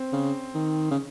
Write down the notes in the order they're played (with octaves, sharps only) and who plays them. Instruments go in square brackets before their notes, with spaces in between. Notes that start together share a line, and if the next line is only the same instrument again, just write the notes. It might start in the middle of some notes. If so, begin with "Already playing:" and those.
Already playing: [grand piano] C4
[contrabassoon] C#3
D#3
C#3